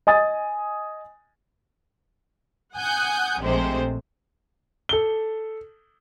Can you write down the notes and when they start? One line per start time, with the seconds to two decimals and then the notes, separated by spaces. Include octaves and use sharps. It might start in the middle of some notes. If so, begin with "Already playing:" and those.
0.07 D#5 G#5 D#6 A6
2.75 F#5 G#5 D#6 F#6 G6
3.40 A#1 C3 G#3 A3 C5
4.89 A4 G7